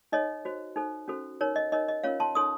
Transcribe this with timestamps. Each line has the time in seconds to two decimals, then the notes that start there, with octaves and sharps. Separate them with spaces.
0.12 D#4 A4 C#5 D#5
0.45 F#4 C5
0.76 D#4 A4 C5
1.08 C#4 F#4 A4 C5
1.41 D#4 A#4 C#5
1.56 D#5
1.72 D#4 A#4 C#5 D#5
1.89 D#5
2.04 C#4 F4 A#4 C#5 F5
2.20 A5 C6
2.35 D#4 A4 C#5 C6 D#6